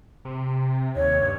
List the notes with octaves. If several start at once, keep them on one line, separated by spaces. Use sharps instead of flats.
C3
D#2 C#5
G2